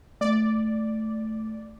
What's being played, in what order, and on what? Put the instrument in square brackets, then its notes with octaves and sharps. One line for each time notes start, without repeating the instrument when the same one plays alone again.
[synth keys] A3 [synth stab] D5